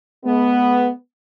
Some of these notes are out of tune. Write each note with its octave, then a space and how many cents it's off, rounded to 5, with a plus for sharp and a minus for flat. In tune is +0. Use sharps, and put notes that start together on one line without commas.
G#3 +40 B3 +0